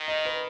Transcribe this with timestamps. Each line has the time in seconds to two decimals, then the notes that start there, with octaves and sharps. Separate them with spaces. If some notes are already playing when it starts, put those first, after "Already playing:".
Already playing: D#3
0.08 D#5
0.25 B4